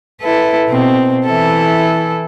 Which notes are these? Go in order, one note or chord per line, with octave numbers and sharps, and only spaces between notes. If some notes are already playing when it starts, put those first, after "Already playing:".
E4 A4 B4
B2 C4
E3 E4 A4